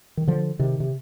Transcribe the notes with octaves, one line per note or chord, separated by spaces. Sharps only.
D#3
D3 F3
C3 D#3
C3